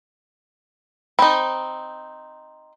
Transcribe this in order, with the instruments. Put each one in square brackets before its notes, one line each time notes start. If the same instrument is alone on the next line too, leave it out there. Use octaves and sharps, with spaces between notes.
[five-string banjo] C4 D#4 [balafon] B5